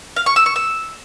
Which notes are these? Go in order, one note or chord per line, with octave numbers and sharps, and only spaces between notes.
F5
C#6
E6
C#6
E6